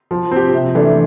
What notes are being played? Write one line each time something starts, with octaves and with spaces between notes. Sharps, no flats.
F3
C4 G4
C3
E3 A3 D4